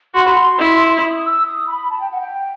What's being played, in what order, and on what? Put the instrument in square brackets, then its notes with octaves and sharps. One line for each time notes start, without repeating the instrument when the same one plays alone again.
[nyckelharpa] F#4 [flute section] C6
[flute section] B5
C6
[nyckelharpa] E4
[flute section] C6
D#6
D#6
E6
D#6
B5
A5
G5
F#5
G5